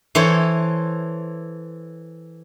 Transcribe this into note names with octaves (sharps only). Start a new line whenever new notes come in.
E3 A4 C5 C#5